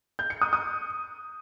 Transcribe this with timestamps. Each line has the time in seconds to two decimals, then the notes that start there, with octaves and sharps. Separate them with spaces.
0.19 G6
0.30 C#7
0.41 D#6
0.53 D#6